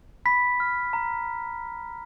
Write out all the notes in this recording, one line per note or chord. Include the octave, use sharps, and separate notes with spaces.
B5 B6
F6
A#5